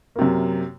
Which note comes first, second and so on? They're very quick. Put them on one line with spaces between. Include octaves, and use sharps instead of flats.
A#3 C3 F#2